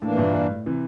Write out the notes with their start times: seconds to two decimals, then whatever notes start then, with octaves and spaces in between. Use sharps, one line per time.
0.02 A2 E3 A#3 D4
0.18 G2 A#2
0.34 G2
0.50 A2
0.66 C3 E3